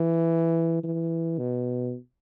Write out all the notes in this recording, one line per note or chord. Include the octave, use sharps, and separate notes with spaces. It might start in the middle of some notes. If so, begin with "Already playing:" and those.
Already playing: E3
E3
B2